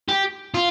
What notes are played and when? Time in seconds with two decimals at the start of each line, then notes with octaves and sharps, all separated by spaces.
0.09 G4
0.54 F4